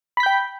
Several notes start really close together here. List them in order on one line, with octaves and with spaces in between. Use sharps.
B5 B6 G6 G5